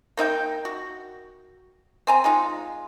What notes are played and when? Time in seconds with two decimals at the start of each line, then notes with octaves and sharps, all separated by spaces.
0.17 A#3 D#4 E5 G5
0.65 F#4
2.07 C4 G#5 A#5
2.24 G#3 D#4 F4